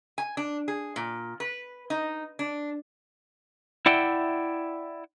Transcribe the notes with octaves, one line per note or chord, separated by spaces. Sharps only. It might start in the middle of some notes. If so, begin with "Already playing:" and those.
G#5
D4
G#4
A#2
B4
D#4
D4
E4 D5 E5 F#5 G5